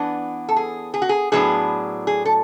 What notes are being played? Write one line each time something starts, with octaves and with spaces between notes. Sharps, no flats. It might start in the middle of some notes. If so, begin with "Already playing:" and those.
Already playing: E3 B3 D4
A4
G#4
G#4
F#4
G#4
A2 F#3 B3 D4 G#4
G#4
A4